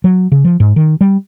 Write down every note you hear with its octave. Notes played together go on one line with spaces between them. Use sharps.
F#3
C#3
F3
G#2
D#3
G3